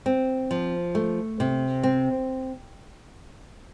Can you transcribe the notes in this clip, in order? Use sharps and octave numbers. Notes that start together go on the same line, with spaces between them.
C4
F3
A3
C3
C4